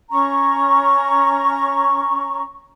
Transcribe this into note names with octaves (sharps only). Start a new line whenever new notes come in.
C#4 A#5 C#6